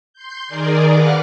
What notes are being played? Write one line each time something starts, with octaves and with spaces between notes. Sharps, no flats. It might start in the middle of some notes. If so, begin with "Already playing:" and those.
C6 G6
D#3 G#4 A#4 D5
B4 F5 F#5 D6 F6 F#6